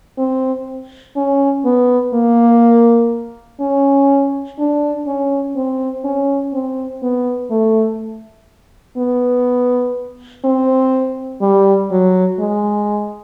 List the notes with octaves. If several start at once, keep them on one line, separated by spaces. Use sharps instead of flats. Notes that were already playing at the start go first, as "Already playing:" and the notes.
C4
C#4
B3
A#3
C#4
D4
C#4
C4
C#4
C4
B3
A3
B3
C4
G3
F#3
G#3